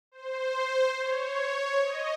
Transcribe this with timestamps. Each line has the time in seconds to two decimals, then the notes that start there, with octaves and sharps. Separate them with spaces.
0.12 C5
0.98 C#5
1.84 D#5